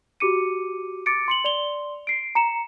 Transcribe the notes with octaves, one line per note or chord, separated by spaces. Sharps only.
F#4 G4 D6 C#7 D#7
D6 A6 C#7 D7
C6 C#7 F#7
D5 C6 F7 G7
C7 D7
A#5 C#7 E7